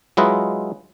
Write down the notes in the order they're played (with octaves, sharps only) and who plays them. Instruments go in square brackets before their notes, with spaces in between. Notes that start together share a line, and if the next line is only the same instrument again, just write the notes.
[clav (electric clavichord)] F#3 G#3 E4 F4 B4 D#5